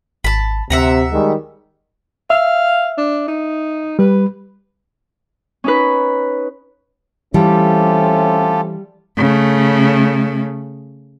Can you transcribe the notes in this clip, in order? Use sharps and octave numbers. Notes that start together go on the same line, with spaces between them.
G#1 A5 B5
D2 C3 E5 F#5 A#5
D#3 G3 G#3
E5 F5
D4
D#4
G3 B4
C#4 D#4 B4
E3 G3 A3 C4 C#4 F4 G4 A4
C#3 A3